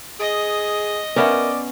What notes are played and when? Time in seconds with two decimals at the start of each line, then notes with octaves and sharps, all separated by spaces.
0.20 G#4 D#5
1.16 B3 C#4 A#4 B4 D5 E5